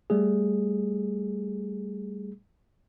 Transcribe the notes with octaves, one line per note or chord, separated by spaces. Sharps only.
G3 A3 G#4